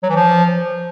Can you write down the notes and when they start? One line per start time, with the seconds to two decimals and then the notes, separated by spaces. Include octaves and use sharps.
0.03 F#3
0.09 E3
0.16 F3